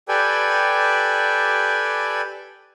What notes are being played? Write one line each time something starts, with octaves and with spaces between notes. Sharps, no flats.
G4 A4 B4 D5 G5 G#5